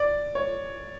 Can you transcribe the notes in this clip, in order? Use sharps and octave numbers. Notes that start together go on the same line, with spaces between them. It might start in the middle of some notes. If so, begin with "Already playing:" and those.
Already playing: D5
C#5